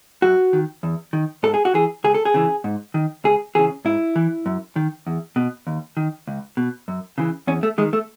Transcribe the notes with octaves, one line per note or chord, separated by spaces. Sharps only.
F#2 F#4
D#3
E2
D#3
G#2 A4
G#4
F#4
E3 G#4
C#2 G#4
A4
G#4
C#3 E3
G#2
D#3
C#2 G#4
C#3 E3 G#4
G#2 E4
E3
F#2
D#3
E2
B2
D#2
D#3
C#2
B2
F#2
C#3 E3
E2 C#4
A3
D#3 G#3
A3